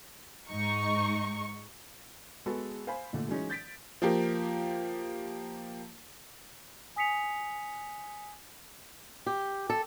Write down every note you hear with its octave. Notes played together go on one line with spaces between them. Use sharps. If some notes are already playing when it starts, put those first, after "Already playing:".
G#2 D#4 C#6
G#3 B3 F#4 G#4 A4
C5 F5 G#5 B5
A#2 D3 A3
E3 F#3 G#3 C#4 D#4
G6 A6 B6 D7
F3 A#3 G4
G#5 D#6 B6 C#7 F7
G4
A4